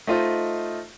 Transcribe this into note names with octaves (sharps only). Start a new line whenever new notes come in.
A3 D#4 F4 C5 D#5